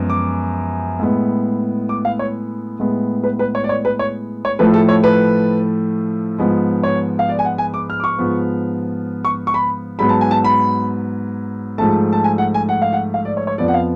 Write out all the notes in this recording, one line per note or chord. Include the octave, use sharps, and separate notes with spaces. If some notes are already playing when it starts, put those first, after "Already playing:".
Already playing: F#2 F3 G#3 B3
D6
A2 G#3 B3
D6
F5
C#5
A2 G#3 B3
B4
B4
C#5
D5
C#5
B4
C#5
C#5
A2 F3 A3 B4
A4
C#5
B4
G#2 F3 G#3 B3
C#5
F5
D5
G#5
F#5
G#5
D6
F6
D6
C#6
G#2 F3 B3
C#6
C#6
B5
G#2 F#3 B3 B5
A5
G#5
A5
B5
G#2 F3 A3 A5
A5
G#5
F#5
G#5
F#5
F5
F#5
F5
D5
C#5
C#5
F2 F3 B3 D5
F#5
F5